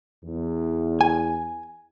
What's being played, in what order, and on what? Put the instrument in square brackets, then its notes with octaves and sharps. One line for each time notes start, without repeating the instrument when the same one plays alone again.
[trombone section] E2
[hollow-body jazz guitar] G#5